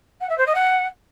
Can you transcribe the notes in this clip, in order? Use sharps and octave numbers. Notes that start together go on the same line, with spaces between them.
F#5
E5
C5
D#5
F#5